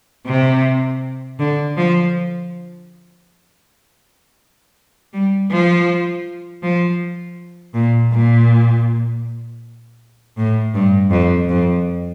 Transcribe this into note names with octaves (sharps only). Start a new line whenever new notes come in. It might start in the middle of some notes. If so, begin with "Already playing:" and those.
C3
D3
F3
G3
F3
F3
A#2
A#2
A2
G2
F2
F2